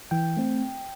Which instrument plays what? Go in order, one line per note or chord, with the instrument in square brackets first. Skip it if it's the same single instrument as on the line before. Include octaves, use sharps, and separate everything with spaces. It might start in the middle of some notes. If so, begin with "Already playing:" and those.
[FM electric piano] E3 G5
A3 C4